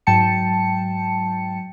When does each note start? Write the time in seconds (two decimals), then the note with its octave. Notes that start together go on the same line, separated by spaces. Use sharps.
0.07 G#2 F#3 G5 A5 C#7